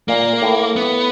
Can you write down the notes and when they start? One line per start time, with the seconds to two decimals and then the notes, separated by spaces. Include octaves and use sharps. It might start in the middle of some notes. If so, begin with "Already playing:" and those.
0.08 A#2 A#3
0.42 A2
0.76 B3